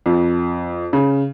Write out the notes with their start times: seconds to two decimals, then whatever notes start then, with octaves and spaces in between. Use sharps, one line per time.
0.06 F2
0.93 C#3